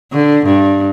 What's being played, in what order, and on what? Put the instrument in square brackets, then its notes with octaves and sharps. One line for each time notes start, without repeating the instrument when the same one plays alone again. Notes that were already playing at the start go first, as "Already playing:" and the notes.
[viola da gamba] D3
G2